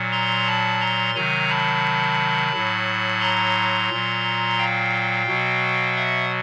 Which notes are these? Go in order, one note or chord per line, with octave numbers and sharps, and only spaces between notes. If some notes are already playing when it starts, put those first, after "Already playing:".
Already playing: A#2 F#3
A#5 C6
A5 B5
A#5 C6
C3 D#3 F#3 G#5 A#5
A5 B5
A2 F#3
A#5 C6
A#2 F#3
F5 G5
B2 F#3
E5 F#5